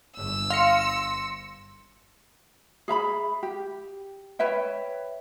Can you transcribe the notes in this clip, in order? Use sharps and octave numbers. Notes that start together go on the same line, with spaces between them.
G1 E6
F5 C6 A#6 C#7
G#4 E5 A#5 B5
G4
B4 C#5 E5 G5